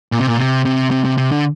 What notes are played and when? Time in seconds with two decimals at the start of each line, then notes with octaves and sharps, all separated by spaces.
0.12 A#2
0.19 C3
0.27 A#2
0.38 C3
0.65 C3
0.91 C3
1.05 C3
1.18 C3
1.32 D3